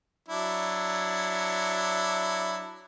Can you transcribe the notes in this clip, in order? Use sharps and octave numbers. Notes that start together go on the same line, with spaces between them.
F#3 D4 E4